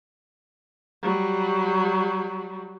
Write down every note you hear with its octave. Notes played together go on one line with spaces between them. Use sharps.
F#3 G3